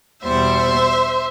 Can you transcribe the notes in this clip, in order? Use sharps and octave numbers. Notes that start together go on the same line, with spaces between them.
E2 B2 G3 C5 E5